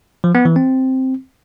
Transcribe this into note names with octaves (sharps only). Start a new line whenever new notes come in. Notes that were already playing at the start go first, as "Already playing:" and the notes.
F3
B3
E3
C4